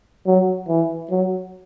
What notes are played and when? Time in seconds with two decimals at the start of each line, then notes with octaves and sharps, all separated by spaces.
0.26 F#3
0.68 E3
1.10 F#3